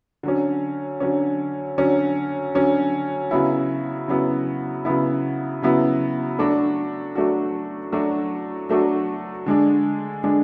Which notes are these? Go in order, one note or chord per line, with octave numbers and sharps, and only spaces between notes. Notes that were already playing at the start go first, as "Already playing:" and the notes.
D3 F#3 C#4
D3 F#3 C#4
D3 F#3 C#4
D3 F#3 C#4
C#3 F#3 B3 E4
C#3 F#3 B3 E4
C#3 F#3 B3 E4
C#3 F#3 B3 E4
F#3 A3 D4 F#4
F#3 A3 D4 F#4
F#3 A3 D4 F#4
F#3 A3 D4 F#4
D3 G#3 D4
D3 G#3 D4